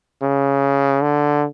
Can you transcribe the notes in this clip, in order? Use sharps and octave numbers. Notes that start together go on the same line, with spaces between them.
C#3
D3